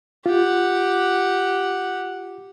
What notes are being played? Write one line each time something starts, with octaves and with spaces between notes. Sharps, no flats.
F4 G4 F#5